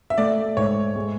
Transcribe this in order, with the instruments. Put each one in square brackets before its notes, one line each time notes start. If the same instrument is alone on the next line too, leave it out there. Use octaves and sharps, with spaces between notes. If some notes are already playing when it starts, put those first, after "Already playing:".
[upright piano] E5
[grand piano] A3 [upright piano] D5
[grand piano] G#2 [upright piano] C#5
[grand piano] G#3